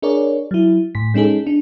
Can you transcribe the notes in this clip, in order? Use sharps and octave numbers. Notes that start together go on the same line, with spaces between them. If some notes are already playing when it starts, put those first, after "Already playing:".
D4 G#4 A#4 C#5 D5
F#3 E4
A2 B6
G#3 C#4 D#4 G#4 A4
D4